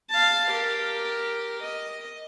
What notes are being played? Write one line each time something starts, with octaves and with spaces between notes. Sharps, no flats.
F5 A5
G4 A#4
D#5